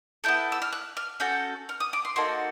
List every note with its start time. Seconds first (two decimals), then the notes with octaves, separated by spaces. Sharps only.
0.24 B3 E4 A4 G6
0.52 E6
0.62 F6
0.73 F#6
0.97 F6
1.20 C#4 F#4 A4 G6
1.69 F6
1.80 D#6
1.93 D6
2.05 C6
2.16 A#3 D#4 F#4 A4 C6